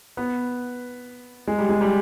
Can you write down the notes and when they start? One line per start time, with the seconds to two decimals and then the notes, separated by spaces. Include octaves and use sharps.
0.17 B3
1.48 G#3
1.59 G3
1.69 G#3
1.81 G3